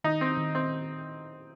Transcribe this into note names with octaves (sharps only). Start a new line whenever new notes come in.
D#3 D#4
C4
D#3
C4